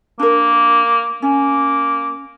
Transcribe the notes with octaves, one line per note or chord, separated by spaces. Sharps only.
A#3 D4 A#4
A#3 C#4